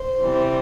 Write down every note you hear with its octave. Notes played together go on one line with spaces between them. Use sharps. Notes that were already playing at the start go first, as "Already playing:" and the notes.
Already playing: C5
C3 E3 G3